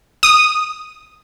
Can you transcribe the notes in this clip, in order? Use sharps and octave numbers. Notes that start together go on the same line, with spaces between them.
D#6